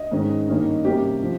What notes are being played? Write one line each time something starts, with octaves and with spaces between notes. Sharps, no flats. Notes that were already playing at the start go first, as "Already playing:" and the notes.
Already playing: D#5
G#2 D#3 G#3 C#4
G2 D#3 A#3 C#4
C3 G3 A#3 C#4 G4
C3 F3